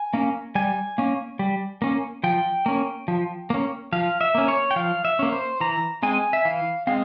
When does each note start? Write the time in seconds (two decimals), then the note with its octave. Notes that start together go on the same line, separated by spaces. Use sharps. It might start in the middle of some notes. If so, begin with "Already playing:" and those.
Already playing: G#5
0.14 A#3 C#4
0.55 G3 G#5
0.98 A#3 C#4
1.39 G3
1.82 A#3 C#4
2.24 F3 G5
2.66 A#3 C#4
3.08 F3
3.50 A#3 C#4
3.92 F3 F5
4.21 E5
4.35 A#3 C#4
4.48 C#5
4.71 G5
4.76 F3 F5
5.05 E5
5.19 A#3 C#4
5.33 C5
5.60 E3 A#5
6.03 G#3 C4 G#5
6.33 E5
6.45 E3 F5
6.87 G#3 C4 F5